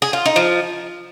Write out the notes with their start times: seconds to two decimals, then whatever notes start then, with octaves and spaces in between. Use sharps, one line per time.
0.02 G#4
0.13 F4
0.26 D#4
0.36 F3